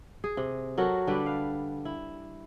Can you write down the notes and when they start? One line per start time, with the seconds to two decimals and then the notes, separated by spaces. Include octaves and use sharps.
0.24 G#4
0.37 C3
0.78 F#3 F#4 A4 A#4
1.07 D3 G3 D4 B4
1.26 F5
1.85 E4